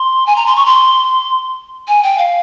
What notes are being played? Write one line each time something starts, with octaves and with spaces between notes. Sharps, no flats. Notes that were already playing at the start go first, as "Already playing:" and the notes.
Already playing: C6
G#5
A#5
C6
C#6
C6
G#5
G5
F5